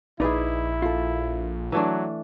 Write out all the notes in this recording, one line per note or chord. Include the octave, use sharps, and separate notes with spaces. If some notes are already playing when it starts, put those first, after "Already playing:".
A#1 D#4 E4 G#4 B4 D5 E5
F4 A4
E3 F#3 A3 D4